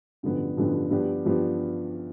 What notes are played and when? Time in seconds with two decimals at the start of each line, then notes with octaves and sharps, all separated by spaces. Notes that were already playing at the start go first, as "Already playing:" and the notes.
0.23 A1 G2 D3 F3 B3
0.57 A1 G2 D3 F3 B3
0.91 G2 F3 B3 D4 G4
1.25 G2 F3 B3 D4 G4